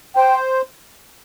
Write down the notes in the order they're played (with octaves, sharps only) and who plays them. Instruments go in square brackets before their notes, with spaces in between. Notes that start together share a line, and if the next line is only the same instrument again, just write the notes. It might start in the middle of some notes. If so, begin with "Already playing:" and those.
[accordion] C5 [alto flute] G5